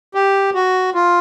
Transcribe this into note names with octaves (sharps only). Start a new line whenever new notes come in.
G4
F#4
F4